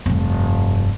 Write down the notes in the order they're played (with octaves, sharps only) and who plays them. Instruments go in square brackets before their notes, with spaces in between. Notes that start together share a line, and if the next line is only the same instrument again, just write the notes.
[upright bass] F1 G2